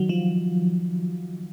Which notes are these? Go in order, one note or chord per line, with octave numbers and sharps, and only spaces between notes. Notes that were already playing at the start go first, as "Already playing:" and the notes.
Already playing: D#3 F#3
F3